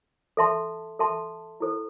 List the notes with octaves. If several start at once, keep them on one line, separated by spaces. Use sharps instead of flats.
A4 E5 A5 C6
A4 E5 A5 C6
E4 A4 C5